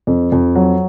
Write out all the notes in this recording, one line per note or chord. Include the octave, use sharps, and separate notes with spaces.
F2
F2
F#3